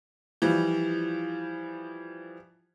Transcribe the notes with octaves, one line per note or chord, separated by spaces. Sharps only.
E3 F3 G3